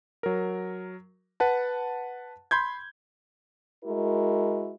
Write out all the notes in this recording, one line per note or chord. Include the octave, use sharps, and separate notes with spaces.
F#3 A#4
B4 F#5 A5
B5 C6 G6 G#6
G#3 E4 F#4 A#4